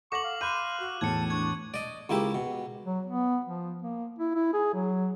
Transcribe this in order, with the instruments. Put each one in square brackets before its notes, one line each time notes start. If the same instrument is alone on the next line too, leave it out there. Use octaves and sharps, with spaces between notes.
[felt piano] A4 A#6 E7 [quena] F#5 [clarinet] C#6 [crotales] D6 F#7
[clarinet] F5
[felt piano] B5 G6 [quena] C6 [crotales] F#6 D#7
[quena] F#4
[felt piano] E2 A2 E3 [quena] A5 [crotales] G#6 C#7
[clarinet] D4 [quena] C#6 [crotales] G#6
[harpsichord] D5 D#5
C#2 A#3 E4 G4 E5
B2
[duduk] F#3
B3
F3
A#3
E4
E4
G#4
F#3